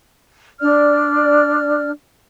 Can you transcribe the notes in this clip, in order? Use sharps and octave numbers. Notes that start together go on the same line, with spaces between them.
D4 D5 F6